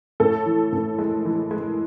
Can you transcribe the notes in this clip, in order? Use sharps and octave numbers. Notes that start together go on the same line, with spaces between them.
A2 A4
E3
A2
G#3
E3
G#3